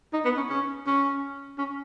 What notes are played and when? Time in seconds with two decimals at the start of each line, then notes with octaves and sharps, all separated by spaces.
0.13 D#4
0.24 B3
0.37 C#4
0.49 C#4
0.86 C#4
1.58 C#4